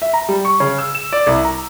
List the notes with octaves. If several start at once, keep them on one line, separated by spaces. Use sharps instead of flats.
E5
A#5
G3
C#6
C#3
E6
E7
D5
C2
A#5